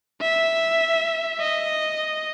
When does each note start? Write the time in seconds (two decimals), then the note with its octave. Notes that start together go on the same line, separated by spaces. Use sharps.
0.21 E5
1.41 D#5